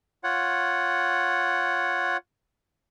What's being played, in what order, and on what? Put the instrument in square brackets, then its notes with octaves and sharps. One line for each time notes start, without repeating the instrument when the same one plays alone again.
[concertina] F4 C#5 F#5